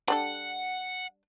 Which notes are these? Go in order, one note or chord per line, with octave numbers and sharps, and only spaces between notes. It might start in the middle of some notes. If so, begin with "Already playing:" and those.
G3 D4 A4 F#5